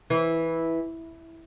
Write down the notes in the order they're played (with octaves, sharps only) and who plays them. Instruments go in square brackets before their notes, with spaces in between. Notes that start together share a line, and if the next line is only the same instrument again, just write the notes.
[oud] E3